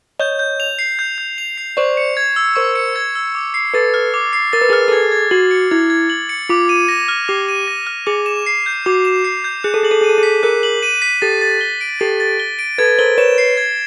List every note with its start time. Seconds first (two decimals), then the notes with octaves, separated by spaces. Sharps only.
0.19 C#5 D#5 G6
0.39 G6
0.60 F7
0.79 C7
0.99 G6
1.18 G6
1.38 F7
1.58 C7
1.77 C5 D5 C#6
1.97 C#7
2.17 G#6
2.36 E6
2.56 A#4 C5 C#6
2.75 C#7
2.96 G#6
3.15 E6
3.35 D6
3.54 C7
3.74 A4 B4 A6
3.94 F6
4.14 D6
4.33 C7
4.53 A#4 A6
4.61 B4
4.69 G#4 A#4
4.73 F6
4.88 A4
4.92 G#4 G#6
5.12 G#6
5.31 F#4 F#7
5.51 C#7
5.71 E4 G#6
5.90 G#6
6.10 F#7
6.29 C#7
6.49 F4 D6
6.69 D#7
6.88 A#6
7.08 F6
7.28 G4 D6
7.48 D#7
7.67 A#6
7.87 F6
8.07 G#4 D6
8.26 E7
8.46 C7
8.66 G6
8.86 F#4 D6
9.05 E7
9.24 C7
9.44 G6
9.64 G#4 F#6
9.74 A4
9.83 G#4 F#7
9.91 A4
10.01 G#4 D#7
10.10 A4
10.18 G#4
10.23 B6
10.43 G#4 A#4 F#6
10.63 F#7
10.83 D#7
11.02 B6
11.22 G4 A4 A6
11.41 A6
11.61 G7
11.81 D7
12.00 G4 A4 A6
12.20 A6
12.40 G7
12.59 D7
12.78 A4 B4 G#6
12.98 A#4 C5 G7
13.18 B4 C#5 E7
13.38 C7
13.57 G#6